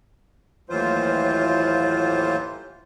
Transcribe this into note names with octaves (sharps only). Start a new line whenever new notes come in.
D#2 A2 E3 F#3 F4 C5